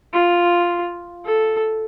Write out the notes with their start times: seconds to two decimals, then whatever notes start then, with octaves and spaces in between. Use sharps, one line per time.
0.14 F4
1.25 A4